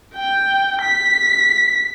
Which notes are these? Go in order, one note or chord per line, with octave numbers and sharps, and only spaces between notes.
G5
B6